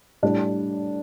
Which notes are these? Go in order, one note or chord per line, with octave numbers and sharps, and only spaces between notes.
A2 G3 D4